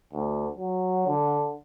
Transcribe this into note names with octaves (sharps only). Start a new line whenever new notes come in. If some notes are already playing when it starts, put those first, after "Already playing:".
D2
F#3
D3